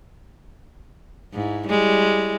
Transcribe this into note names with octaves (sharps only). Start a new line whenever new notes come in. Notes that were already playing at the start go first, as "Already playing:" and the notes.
G#2 E4
G3 G#3 E4